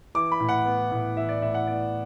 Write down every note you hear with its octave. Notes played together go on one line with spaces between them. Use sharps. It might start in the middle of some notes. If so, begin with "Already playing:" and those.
E3 D6
B5
A2
F#5
B3
A2
E3 E5
D5
A2 E5
F#5
B3 D5